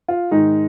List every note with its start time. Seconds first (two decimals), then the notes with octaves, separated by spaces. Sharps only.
0.08 F4
0.31 G#2 D#3 G#3 D#4